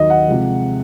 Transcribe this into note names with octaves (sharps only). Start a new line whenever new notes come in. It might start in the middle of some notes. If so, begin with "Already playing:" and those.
Already playing: D#2 D#3 F#3 D#5
F#5
C3 F3 G#3